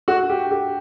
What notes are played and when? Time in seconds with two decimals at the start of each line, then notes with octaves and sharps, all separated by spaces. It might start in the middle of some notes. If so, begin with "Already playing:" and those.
0.08 F#4
0.29 G4
0.51 G4